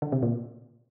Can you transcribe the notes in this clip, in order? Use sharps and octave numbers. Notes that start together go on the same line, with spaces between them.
D3
C3
A#2